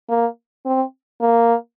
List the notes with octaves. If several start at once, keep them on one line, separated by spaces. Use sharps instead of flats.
A#3
C4
A#3